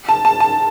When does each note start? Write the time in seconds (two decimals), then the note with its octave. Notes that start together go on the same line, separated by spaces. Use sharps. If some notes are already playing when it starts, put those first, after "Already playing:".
0.09 A5
0.25 A5
0.40 A5